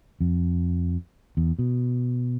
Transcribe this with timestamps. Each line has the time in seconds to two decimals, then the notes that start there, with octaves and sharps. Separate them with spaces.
0.21 F2
1.37 E2
1.59 B2